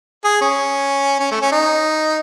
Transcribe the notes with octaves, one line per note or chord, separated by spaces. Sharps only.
G#4
C#4
C#4
A3
C#4
D#4